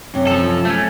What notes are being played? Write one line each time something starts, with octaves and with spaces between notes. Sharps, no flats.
F#2 C3
F3 A4
A3 C#4 E5